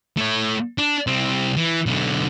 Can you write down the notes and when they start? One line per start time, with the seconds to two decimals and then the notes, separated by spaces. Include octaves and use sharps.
0.17 A3 C#5
0.78 D4
1.07 C2 C4
1.57 E3
1.86 B1 D3